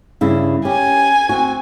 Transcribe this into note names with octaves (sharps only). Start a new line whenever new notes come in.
G2 C#3 E4
C#4 G4 G#5
C4 F#4